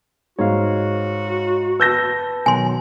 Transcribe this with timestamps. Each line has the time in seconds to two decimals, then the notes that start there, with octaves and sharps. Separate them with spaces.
0.39 G#2 F#4 C#5 F5
1.80 B4 A5 E6 G6 A#6
2.46 B2 D#3 F#3 G#5 C6